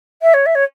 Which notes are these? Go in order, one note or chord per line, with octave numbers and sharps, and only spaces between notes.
E5
C#5
E5
C#5